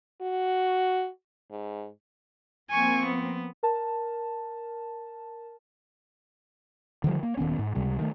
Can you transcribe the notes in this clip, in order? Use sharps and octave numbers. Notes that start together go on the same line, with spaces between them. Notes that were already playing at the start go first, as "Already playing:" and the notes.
F#4
G#2
F3 A#3 C4 G#5 C#6
B3
A#4 A5
D3 D#3 F3 G3
A#3
D#1 D#3 B3 C#4
G#2
C#2 C3 G3
D#3 G#3 A3